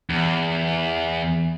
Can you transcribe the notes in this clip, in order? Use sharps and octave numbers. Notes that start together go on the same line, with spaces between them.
E2